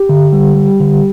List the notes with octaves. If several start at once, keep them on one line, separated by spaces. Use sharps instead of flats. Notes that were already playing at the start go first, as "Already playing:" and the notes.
Already playing: G4
D3
G3
G3
D3